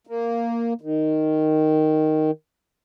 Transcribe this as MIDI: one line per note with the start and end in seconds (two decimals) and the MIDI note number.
0.07 0.73 58
0.81 2.31 51